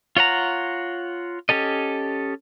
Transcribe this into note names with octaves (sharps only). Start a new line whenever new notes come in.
F4 C#5 F#5 A#5
C#4 G4 A4 D#5